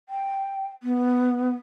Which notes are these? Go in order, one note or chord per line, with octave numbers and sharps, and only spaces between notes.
G5
B3